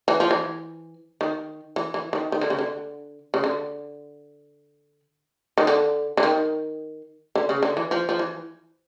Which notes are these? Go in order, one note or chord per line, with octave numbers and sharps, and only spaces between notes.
E3
F3
E3
D#3
E3
E3
D#3
D#3
D3
C#3
D3
C#3
D3
D#3
D3
D3
D#3
D3
C#3
D3
E3
F3
F3
E3